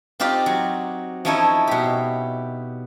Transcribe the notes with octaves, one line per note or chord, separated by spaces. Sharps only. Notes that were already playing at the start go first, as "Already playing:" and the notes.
C4 D#4 F4 G4 D5
F#3
F3 C#4 D#4 E4 A4 C#5
B2 G4